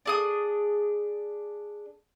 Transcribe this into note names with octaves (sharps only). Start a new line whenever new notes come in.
D4 G#4 D#6